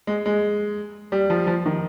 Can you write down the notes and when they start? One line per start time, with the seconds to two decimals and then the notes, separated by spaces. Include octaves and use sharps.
0.07 G#3
0.26 G#3
1.12 G3
1.30 F3
1.47 F3
1.66 D#3